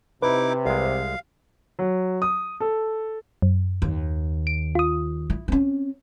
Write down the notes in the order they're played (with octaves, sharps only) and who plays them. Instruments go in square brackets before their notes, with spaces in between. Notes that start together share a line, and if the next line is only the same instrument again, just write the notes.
[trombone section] C3 [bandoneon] D#4 E4 D6 [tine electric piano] B4
[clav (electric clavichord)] C2 G#3 [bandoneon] F5
[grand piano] F#3
D#6
A4
[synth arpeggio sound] F#2
[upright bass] D#2
[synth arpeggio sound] D7
F4 D#6
[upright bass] E4
C4 C#4